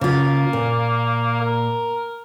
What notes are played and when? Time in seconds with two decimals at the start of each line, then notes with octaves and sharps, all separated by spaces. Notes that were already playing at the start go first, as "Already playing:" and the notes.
0.01 C#3 A#3 F4
0.53 A#2
1.41 A#4